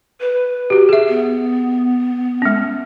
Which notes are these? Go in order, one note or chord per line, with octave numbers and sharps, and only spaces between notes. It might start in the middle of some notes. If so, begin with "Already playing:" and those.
B4
F#4 G4
G#4 E5
B3
G#3 C#4